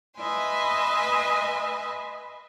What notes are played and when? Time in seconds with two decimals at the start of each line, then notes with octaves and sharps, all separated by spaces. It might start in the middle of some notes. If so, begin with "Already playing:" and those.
0.16 B4 D#5 E5 G#5 C6